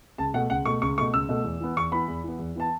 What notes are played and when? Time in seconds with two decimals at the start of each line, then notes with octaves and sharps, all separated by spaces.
0.18 C#2 A5
0.34 B2 A3 F#5
0.50 C#2 F#5
0.65 B2 A3 C#6
0.82 C#2 C#6
0.98 B2 A3 C#6
1.14 C#2 E6
1.29 B2 A3
1.44 E2
1.60 E3 B3
1.77 E2 C#6
1.92 E3 B3 B5
2.08 E2
2.24 E3 B3
2.39 E2
2.55 E3 B3 A5